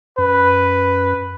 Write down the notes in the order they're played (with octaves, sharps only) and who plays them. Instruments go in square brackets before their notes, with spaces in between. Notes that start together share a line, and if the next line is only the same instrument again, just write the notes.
[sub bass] F#2 [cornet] B4